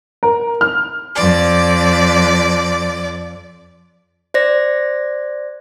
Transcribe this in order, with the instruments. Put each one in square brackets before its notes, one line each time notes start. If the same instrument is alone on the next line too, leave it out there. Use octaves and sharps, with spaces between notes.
[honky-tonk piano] A#4
F6
[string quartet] F2 D5
[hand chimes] C5 D5 A#6